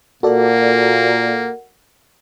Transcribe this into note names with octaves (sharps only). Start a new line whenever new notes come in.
A#2 A#3 F#4 A4 A#4 D5 F#5